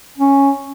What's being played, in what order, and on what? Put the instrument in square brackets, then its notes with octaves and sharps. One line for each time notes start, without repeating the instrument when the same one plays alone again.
[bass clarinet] C#4